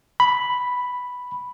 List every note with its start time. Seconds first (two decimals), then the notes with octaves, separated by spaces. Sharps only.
0.20 B5